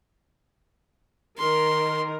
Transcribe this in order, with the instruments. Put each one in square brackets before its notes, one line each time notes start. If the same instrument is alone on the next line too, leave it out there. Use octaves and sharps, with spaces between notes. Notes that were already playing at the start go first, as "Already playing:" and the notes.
[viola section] D#3 A#4 [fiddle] C6